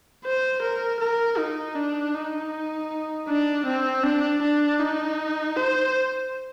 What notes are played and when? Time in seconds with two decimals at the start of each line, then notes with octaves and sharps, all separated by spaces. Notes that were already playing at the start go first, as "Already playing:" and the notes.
0.25 C5
0.62 A#4
1.00 A#4
1.38 D#4
1.76 D4
2.14 D#4
3.28 D4
3.66 C4
4.03 D4
4.42 D4
4.80 D#4
5.56 C5